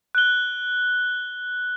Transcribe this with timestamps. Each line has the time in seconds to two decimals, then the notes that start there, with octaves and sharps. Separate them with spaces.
0.15 F#6 G7